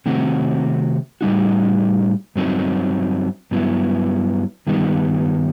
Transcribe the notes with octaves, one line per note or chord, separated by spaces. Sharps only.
C3 D#3 A3 C4 F#4
A2 G3 D#4 F#4
G2 F#3 C4 D#4
G2 F#3 B3 E4
G2 D#3 G3 B3 D#4